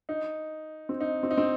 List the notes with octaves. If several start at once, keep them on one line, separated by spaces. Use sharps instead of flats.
D#4
C4
D#4
C4
D#4
C4